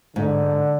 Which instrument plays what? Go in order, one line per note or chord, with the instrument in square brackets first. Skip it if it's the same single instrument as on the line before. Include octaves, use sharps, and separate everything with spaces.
[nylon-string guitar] G#2 [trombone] D3